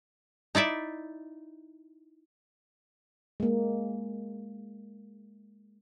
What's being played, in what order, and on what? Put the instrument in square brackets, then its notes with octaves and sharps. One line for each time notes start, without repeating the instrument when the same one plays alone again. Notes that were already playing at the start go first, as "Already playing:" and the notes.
[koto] D#4 E4 D5 E5
[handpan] G#3 A#3